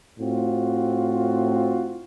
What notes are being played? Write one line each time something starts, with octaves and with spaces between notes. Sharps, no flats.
A2 C4 F4 F#4